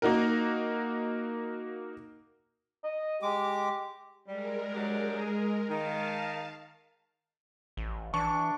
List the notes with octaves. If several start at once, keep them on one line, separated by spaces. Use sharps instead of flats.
A#3 D#4 F#4 A#4
D#5
G#3 G4 D6
G3 G#3 A#4
F#3 D4 G4
G#4
D#3 F5 A5
A1
E3 D4 C#6